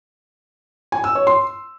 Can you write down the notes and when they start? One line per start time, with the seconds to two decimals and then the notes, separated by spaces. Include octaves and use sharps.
0.92 G#5
1.04 E6
1.15 C#5
1.27 C6